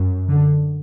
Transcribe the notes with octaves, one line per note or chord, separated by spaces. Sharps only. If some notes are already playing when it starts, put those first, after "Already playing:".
Already playing: F#2
D3